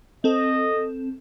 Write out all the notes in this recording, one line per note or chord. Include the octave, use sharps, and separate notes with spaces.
C4 A4 D#5